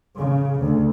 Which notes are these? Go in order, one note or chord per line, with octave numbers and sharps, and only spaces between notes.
C#3
D2